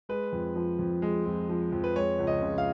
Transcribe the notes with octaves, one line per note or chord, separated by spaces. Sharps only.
G#3 B4
F2
F3
F2
G#3
F2
F3
F2
B4
G#3 C#5
C#2
D#5
C#3
F5